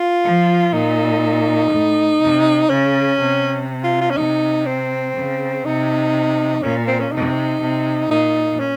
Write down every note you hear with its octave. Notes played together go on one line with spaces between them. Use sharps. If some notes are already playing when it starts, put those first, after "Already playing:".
Already playing: F4
F3
A#2 D#4
A2
C3
C#3 C#4
C3
F4
F4
C#4
C3 D#4
C4
C#3
C3 D#4
A#2 C#4
C4
C#4
C3 D#4
C3
A#2 D#4
C#4